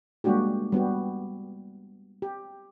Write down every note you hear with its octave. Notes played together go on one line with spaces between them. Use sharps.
G3 G#3 A#3 D4 F#4 G4
G3 B3 F#4 G4
G4